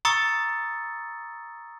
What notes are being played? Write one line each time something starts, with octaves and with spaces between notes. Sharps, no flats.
A#5 C#6 D#6 E6 A6 C#7